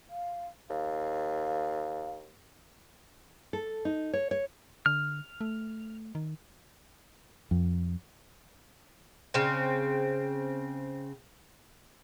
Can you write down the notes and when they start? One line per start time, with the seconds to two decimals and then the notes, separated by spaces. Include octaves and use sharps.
0.09 F5
0.70 D#2 F5
3.53 A4
3.85 D#4
4.13 C#5
4.31 C#5
4.86 D3 F6
5.41 A3
6.15 D#3
7.51 F2
9.34 C#3 C4